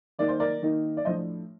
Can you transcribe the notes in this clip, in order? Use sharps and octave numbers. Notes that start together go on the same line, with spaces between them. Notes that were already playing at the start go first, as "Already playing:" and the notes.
D#3 A#3 D#4 D5
C5
A#4 D5
D#3 A#3 D#4
D5
A2 F3 A3 D4 C5 D#5